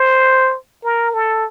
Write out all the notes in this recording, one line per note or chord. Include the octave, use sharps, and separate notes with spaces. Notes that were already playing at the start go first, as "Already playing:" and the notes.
Already playing: C5
A#4
A4